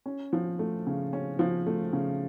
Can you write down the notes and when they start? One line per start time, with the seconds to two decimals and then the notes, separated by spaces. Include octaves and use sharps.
0.06 C#4
0.33 F3
0.59 A3
0.87 C#3
1.13 C#4
1.39 F3
1.67 A3
1.93 C#3